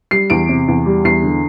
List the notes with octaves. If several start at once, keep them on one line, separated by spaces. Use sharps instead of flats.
G3 C7
E2 D7
C3
E2
G3
E2 C7
D3